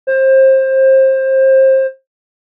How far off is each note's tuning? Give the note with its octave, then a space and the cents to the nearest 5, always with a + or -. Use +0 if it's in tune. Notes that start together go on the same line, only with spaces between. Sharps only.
C5 +25